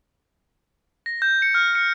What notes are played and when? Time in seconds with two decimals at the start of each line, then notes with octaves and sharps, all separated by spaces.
1.06 A#6
1.22 G6
1.42 C#7
1.55 F6
1.75 C#7